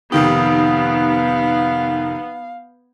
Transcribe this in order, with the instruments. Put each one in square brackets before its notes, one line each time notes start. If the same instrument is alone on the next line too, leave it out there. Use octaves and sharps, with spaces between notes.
[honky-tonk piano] F1 D#3 G4 [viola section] B3 [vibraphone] D#4 [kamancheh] F5